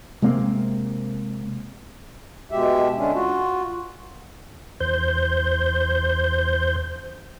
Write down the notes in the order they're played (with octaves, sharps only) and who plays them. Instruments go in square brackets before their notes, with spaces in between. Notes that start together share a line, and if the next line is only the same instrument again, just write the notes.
[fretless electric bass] C3 G#3 A#3 C4
[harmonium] B2 G#3 G4 E5
D3 G#3 C#4 D4
F4 F#4
[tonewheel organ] E2 C5 G6